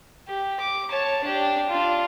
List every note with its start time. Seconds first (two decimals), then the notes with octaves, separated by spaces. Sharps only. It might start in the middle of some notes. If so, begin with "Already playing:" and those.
0.28 G4
0.60 D6
0.90 C#5 A5
1.24 D4 G4
1.69 D4 F4